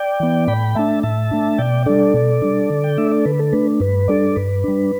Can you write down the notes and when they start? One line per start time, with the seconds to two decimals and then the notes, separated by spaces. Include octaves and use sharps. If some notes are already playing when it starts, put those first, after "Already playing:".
Already playing: D5 G5
0.20 E3 B3
0.47 A2 G5 B5
0.75 A3 D4 E5 A5
1.03 A2 E5 A5
1.31 A3 D4
1.58 B2 D5 G5
1.86 G3 D4 A4 D5
2.14 B2
2.42 G3 D4
2.70 D3
2.84 G5
2.98 A3 D4 E5
3.11 D5
3.25 D3 B4
3.39 A4
3.52 A3 D4 B4
3.80 G2 B4
4.08 G3 D4 A4 D5
4.36 G2 B4
4.64 G3 D4